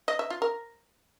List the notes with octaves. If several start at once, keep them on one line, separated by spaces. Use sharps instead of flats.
D#5
E5
F4
A#4